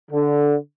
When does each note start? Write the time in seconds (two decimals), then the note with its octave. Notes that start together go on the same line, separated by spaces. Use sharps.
0.11 D3